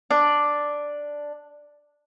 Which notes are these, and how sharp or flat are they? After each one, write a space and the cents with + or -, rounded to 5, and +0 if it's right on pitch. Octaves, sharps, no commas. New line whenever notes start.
D4 +0 D5 +0